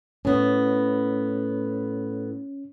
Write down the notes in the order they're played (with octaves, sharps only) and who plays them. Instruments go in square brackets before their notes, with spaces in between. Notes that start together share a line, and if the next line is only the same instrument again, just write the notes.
[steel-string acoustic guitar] A2 B3 [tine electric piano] C#4